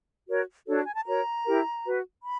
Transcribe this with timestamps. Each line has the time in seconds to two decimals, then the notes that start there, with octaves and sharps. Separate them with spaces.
0.27 F#4 A#4 C#5
0.67 D4 F#4 A4 C#5
0.85 G#5
0.95 A5
1.06 F#4 A#4 C#5 A#5
1.45 E4 G4 A#4
1.85 F#4 B4
2.24 B5